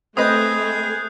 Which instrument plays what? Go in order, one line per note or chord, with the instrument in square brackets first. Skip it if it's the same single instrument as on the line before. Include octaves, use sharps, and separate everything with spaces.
[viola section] A3 [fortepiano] C4 B4 D#5 [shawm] G#4 [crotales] D#6 F#6 G6